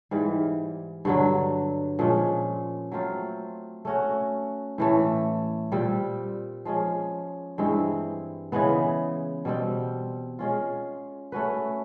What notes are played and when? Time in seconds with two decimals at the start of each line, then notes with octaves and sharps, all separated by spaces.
0.11 G#2 E3 G3
1.05 G2 D3 F#3
1.99 A#2 F3 G#3 C#4
2.92 F#3 A3 C4 F4
3.85 A3 C#4 F#4
4.78 A2 E3 A3
5.72 A#2 G3 C4
6.65 F3 G#3 C#4
7.58 G2 E3 G#3 C4
8.52 C#3 E3 G#3 B3
9.45 B2 G3 C4
10.39 G#3 C#4 F4
11.32 A3 C#4 F#4 B4